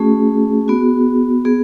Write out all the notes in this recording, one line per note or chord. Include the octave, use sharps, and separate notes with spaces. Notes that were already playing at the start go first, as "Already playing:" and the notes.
Already playing: A3 C#4 F#4 G#4
B3 F#4
B3 G#4